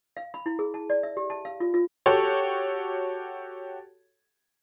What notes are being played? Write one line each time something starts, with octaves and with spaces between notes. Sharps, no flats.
F5
B5
E4
G#4
A5
D5
E5
G4
A5
F5
F4
F4
F#4 G4 A4 C#5